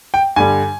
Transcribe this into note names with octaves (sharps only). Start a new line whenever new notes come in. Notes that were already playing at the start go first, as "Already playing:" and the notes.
G5
G2 D3 G3 G#5